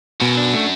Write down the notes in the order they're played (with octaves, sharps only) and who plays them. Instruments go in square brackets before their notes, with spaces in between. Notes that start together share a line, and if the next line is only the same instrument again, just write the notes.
[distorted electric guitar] F#2 [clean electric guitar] B2
[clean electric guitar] D4
A3